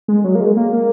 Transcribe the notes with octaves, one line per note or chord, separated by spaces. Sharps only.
G#3
F#3
A#3
G#3
A#3
A#3